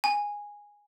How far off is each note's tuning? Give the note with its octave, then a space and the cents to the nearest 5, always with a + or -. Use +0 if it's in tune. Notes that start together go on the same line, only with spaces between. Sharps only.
G#5 -10